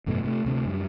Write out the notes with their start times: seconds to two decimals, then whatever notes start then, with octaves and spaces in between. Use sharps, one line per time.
0.06 G#1 F#2 B2 A3
0.23 C3 G3 A3
0.45 D2 C3 G#3 A3
0.65 F#2 G3